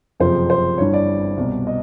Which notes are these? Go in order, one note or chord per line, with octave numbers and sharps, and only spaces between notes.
F#1 F2 C3 F3 C5
C5
G1 G2 E3 C#5
D5
C2 B2
D#5